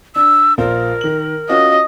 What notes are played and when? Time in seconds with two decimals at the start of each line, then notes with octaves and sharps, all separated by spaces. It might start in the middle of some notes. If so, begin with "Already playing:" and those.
0.16 D4 E6
0.58 A#1 F4 A#4 C5
1.01 D#3 F#7
1.49 C#4 F4 F#4 D#5